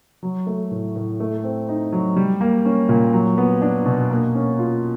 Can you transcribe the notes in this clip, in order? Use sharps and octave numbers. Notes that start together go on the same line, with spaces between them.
F#3
A3
A2
A2
A3
C4
D#4
F#3
G3
A#3
C#4
A#2
F#3
B3
D4
B2
A#3
C#4
F4